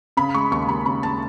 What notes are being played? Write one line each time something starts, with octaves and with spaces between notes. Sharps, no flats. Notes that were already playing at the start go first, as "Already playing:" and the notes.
C#3 B5
G#3 C#6
D#2 C#6
D#2 B5
C#3 B5
G#3 A5